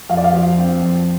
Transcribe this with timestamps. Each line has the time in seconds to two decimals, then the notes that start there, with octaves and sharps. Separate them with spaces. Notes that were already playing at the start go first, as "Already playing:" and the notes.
0.09 F2 F5
0.17 D5
0.24 F5
0.33 F3
0.58 C4
0.82 F2